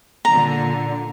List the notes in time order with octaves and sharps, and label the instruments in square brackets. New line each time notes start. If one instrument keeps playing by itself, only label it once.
[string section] A#2 D3 [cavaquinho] A#5